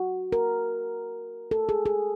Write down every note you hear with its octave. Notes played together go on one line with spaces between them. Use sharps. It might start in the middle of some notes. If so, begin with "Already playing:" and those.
Already playing: F#4
A#4
A4
G#4
G#4